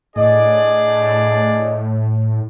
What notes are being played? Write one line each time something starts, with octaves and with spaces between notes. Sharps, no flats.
A2 D4 G#4 D5 D#5